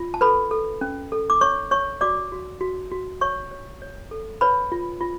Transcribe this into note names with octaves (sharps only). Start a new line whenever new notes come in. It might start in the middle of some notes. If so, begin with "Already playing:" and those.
Already playing: F4
A5
A4 B4 B5
A4
C#4
A4
D6
C#5 C#6
C#5 C#6
F#4 D5 D6
F#4
F#4
F#4
C#5 C#6
C#5
C#5
A4
B4 C#5 B5
F4
F4